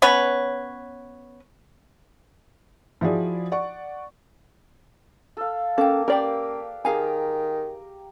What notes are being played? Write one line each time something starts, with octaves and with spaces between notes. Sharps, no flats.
B3 C#4 B4 C#5
F3 E4 F#4 G#4 D5
D5 F#5 C#6
A4 F5
A#3 C#4 A4 F5 G5
C#4 G4 A#4 B4 D5 F5 G5
D#3 G4 G#4 F5 G#5 A#5